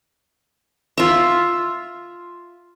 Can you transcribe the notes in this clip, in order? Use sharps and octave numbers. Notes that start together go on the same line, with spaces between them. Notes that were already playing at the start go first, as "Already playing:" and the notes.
F4 E5